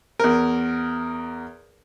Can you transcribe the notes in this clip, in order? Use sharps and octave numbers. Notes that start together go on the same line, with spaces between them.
E2 A#4